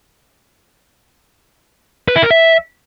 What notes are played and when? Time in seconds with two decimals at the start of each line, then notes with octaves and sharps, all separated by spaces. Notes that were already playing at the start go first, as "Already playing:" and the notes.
2.08 B4
2.16 E4
2.23 A#4
2.31 E5